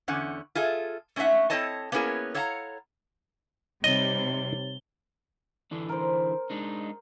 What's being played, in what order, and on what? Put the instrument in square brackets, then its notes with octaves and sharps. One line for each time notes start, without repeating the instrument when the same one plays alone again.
[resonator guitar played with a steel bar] E2 D3 C#4 F#5
F4 G#4 A4 E5
A3 C#4 D#4 D5 E5 F#5
C4 E4 A4 C#5 D#5 A5
A#3 B3 C#4 E4 G#4 A#4
A4 C#5 F5 F#5 A5 A#5
[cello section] C3 G3 [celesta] D#4 C#5 A6 [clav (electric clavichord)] D#5 [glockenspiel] G7
[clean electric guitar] D3 E3 D4
[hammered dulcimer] A#4 C5
[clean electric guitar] G#3 D4 D#4